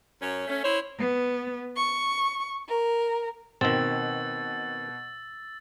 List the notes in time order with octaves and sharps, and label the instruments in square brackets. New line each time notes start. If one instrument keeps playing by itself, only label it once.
[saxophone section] F#2 C#4 C#5
A3 C#4
E4 C5 C#5
[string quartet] B3
C#6
A#4
[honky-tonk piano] B2 [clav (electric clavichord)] D#3 C4 [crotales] E6 A6